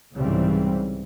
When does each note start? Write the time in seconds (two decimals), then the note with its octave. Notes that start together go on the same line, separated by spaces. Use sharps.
0.17 C2 G#2 C#3 E3 G3 C4